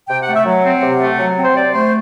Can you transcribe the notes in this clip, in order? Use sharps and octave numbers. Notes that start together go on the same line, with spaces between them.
C3 G5
F#5
A3
E5
F#3 F#5
C4
C3
A3
F#3
C4
C5
C3 D5
A3 C5